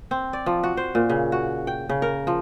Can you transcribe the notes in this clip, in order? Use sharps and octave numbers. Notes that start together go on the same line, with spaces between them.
C4
D5
F3
F#4
C5
A#2
C#3
F#4
G5
C#3
A#4
F3